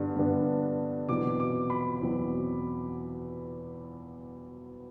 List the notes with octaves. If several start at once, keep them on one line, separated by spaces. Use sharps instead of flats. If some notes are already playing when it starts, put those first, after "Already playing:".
Already playing: G2 D3 G3 B3 D4
G2 D3 G3 B3 D4
E2 B2 F#3 C4 D6
D6
B5
E2 B2 F#3 C4